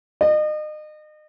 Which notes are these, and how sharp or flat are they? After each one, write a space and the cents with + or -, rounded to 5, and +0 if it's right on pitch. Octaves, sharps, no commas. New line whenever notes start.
D#5 -35